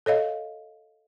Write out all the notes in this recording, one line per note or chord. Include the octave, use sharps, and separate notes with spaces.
A4 C#5 D#5 F5